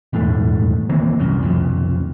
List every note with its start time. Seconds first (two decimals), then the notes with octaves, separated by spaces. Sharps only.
0.13 D#1 E2 G#2 A3
0.89 D#3 E3 A#3 C4
1.20 C2 F#2
1.43 F1 B1 F2